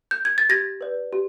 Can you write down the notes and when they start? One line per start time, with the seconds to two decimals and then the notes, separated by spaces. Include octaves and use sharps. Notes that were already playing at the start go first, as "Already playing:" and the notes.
0.11 G6
0.25 G#6
0.38 A6
0.49 G4 G#6 A#6
0.81 B4 D5
1.13 G4